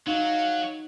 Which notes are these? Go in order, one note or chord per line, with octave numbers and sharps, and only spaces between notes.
F#3 D#4 F5